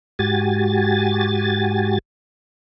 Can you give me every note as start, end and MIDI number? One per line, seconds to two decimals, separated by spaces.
0.19 1.98 44
0.19 1.98 66
0.19 1.98 67
0.19 1.98 80
0.19 1.98 93